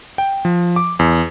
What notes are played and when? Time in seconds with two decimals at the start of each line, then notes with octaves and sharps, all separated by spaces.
0.18 G5
0.45 F3
0.76 D6
0.99 E2